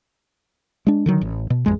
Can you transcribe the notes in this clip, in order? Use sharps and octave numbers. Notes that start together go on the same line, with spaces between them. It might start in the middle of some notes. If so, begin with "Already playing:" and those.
G#3 D4
D3 D#3 F#3
A1
B2
A1 F2 G#3